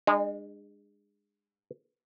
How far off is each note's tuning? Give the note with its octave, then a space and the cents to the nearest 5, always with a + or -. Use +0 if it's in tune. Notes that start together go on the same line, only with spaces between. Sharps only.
G#3 -25 D4 +40